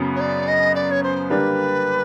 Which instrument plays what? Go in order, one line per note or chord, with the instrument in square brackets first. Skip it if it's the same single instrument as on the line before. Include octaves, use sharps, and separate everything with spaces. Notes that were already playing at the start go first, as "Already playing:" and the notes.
Already playing: [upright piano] F#2 C#3 F#3 B3
[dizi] C#5
D5
D#5
D5
C#5
C5
[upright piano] D3 G3 A#3 D4 G4 [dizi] B4